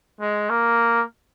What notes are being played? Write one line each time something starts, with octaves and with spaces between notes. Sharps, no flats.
G#3
A#3